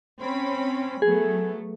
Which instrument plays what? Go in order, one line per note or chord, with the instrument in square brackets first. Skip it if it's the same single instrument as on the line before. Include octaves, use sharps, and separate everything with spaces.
[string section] C4 C#4 B5
[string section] F#3 A3 B3 [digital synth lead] G#4